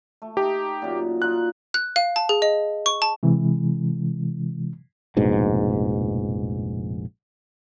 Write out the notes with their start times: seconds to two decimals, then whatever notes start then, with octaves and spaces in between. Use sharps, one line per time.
0.22 A3
0.37 D#4 G4 G5 A#5
0.82 F#2 A#2
1.22 D#4 F4 A#4 F#6
1.74 F#6
1.96 F5
2.16 A5
2.29 G#4
2.42 D#5
2.86 C#6
3.02 A5
3.23 C3 E3 G#3
5.17 F1 A#1 G#2 B2